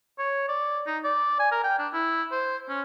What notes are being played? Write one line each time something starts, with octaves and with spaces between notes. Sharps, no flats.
C#5
D5
D#4
D5
G#5
A#4
G5
D4
E4
C5
C#4